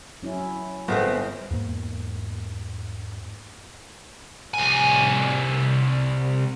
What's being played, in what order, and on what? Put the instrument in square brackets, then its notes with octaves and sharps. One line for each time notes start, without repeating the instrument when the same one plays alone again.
[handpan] F#3 C#4 E4
[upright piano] G1 [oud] B3 C4 G#4
[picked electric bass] E2 G#2 A#3 B3
[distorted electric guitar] C2 G#5